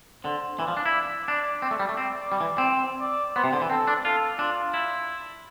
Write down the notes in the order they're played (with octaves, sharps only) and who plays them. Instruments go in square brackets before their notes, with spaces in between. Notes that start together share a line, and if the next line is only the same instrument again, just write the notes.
[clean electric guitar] D3 [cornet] C5
[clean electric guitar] E3 [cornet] D5
[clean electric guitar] F3
D4
E4
[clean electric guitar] D4 [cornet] D5
[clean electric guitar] C4 [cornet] D5
[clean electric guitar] A3
G3
A3
[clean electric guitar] C4 [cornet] D5
[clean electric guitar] G3
E3
C4
[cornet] D5
[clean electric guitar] B3 [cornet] C5
[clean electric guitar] C3
D3
E3
[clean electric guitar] C4 [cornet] A4
[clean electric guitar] D4
[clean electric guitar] F4 [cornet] A4
[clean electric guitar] D4 [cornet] F4
[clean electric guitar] E4